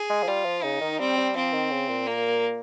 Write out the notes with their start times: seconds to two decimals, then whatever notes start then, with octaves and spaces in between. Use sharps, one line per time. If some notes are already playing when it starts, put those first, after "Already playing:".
Already playing: G#4
0.10 G#3
0.23 F3
0.28 G3 F4
0.45 F3
0.63 C#3 D#4
0.81 D#3
1.00 G3 C4
1.17 G3
1.36 F3 C4
1.53 D#3
1.71 C#3
1.89 A#2
2.07 A#3